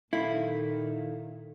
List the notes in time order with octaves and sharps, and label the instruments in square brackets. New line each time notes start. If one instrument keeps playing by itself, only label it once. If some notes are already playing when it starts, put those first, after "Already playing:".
[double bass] A#2 D#3 [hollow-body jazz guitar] E4 [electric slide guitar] A4 F5